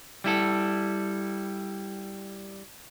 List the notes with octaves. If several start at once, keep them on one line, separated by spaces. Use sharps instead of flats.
G3 E4 A4